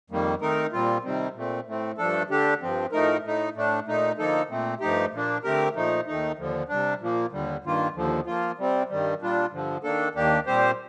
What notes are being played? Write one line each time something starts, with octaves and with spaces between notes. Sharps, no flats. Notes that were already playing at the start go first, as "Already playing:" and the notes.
F2 D#3 G3 A#3
D#3 A3 C4 D#4 A#4
A#2 G3 C4 F4
C3 D#3 G3 C4
A#2 A3 C4
A2 A3 C4
G2 F3 A3 D4 A4
D3 A3 D4 G4
G2 F3 C4
A2 F3 A3 D#4 A#4
A2 A3 D#4
A2 A3 D4
A#2 A3 D#4
D3 F3 A#3 D#4 A4
A#2 A3 C4
G2 F3 A3 D#4 G4
A#2 F3 A#3 D4
D3 A3 C4 G4 A#4
A#2 F3 A3 D#4
D#2 D#3 A3 D#4
D#2 D3 F3
C3 G3 D4
A#2 F3 A#3
D#2 D3 G3
G2 D#3 A#3 F4
D#2 D3 F3
F3 A#3 F4
C3 G3 C4
G2 D#3 G3
A#2 G3 D4 F4
G2 D3 F3
D#3 A#3 D4 A4
D#2 D#3 A#3 D4 G4
A#2 G3 C4 G4 C5